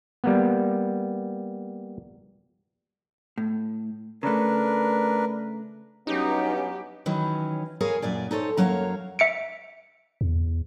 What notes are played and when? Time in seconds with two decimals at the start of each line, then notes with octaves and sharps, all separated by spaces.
0.24 G3 A#3 B3
3.38 A2
4.23 C#3 A3 D4 A#4 B4
6.07 G2 F#3 B3 C#4 D#4 G4
7.06 D#3 E3 F#3 C#4
7.81 G#4 A#4 C#5 F5 G#5
8.02 F#2 A#2 D5 G#5
8.31 D#4 A4 C5 C#5
8.57 F#2 F#3 A#3 C#5 F5 A#5
9.19 E5 C#7 D7
10.21 E2